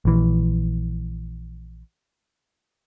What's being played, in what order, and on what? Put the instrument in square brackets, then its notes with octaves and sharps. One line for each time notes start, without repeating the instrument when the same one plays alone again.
[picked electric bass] A#1 E3